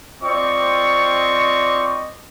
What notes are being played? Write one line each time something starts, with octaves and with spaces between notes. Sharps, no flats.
C4 F4 D5 D#5 C#6